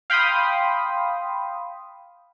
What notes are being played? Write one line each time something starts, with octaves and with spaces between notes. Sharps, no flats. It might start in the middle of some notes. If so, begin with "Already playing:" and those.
F5 G5 B5 C6 D#6